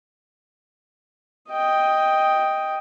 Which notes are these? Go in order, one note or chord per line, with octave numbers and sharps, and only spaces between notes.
D#5 G5